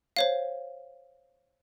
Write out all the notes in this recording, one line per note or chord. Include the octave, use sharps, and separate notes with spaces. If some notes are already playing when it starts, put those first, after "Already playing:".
C5 C#5 F5